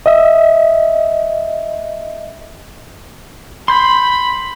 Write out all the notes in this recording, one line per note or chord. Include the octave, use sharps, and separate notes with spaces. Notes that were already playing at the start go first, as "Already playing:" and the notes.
D#5 E5
B5 C6 G6